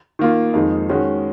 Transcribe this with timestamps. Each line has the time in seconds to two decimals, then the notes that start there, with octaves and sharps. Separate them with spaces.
0.19 D#3 A#3 F4
0.53 F2 D#3 G#3 D#4
0.89 D#3 G#3 C#4 F#4